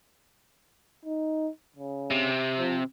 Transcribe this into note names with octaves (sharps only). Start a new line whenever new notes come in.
D#4
C#3
C3
F3